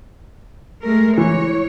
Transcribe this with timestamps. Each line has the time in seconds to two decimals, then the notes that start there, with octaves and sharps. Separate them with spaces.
0.83 G#3 A3 A#4
1.18 E3 C#5